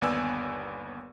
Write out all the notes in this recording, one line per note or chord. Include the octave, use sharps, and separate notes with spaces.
G1 D#2 B3 D5 G#5 E6